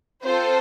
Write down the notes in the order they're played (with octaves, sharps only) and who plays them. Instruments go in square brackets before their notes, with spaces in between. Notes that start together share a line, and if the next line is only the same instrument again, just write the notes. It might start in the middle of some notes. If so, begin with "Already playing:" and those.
[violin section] C4 F4 A4 C5